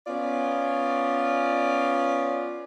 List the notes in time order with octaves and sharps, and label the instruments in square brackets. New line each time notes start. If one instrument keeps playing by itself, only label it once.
[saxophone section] B3 C#4 F4 D5